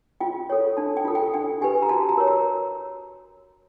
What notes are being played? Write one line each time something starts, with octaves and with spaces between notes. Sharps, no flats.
F4 G5
A4 C#5
D4 A5
G5
F4 A4
G5
D4 G5
G4 B4 G#5
A#5
F#4 A5
A#5
A#4 C#5
A#5